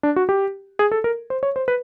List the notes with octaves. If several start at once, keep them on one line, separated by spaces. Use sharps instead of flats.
D4
F#4
G4
G#4
A4
A#4
C5
C#5
C5
B4